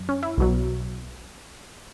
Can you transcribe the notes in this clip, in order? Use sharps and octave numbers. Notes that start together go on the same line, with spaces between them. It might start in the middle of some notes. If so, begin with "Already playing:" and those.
Already playing: F#2
C#4
E4
B1 B2 F#3